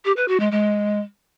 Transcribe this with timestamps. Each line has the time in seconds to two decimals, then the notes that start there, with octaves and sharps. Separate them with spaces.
0.05 G4
0.17 B4
0.28 F#4
0.40 G#3
0.51 G#3